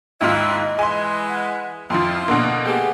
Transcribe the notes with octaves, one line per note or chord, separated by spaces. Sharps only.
D#2 G#2 E4 F4 D#5
E3 G#3 G#5 C6
F#5
F2 F3 C4 E4 F4 C6
B2 D3 A#3
A3 B3 G4 G#4